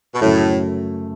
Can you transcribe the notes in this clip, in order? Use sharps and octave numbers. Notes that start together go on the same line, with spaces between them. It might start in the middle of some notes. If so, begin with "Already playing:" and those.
B2
F#2 A2 C#3 F#3 A3